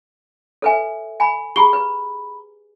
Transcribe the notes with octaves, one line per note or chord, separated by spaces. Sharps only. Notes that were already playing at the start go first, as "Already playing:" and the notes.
A4 B4 C#5 E5 G#5
G#5 B5
G4 G#4 A#5 B5 G7
B4